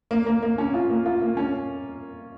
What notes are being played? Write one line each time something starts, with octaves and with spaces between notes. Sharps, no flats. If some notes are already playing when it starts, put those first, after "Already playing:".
A#3
A#3
A#3
C#4
F4
A#3
F4
A#3
C#4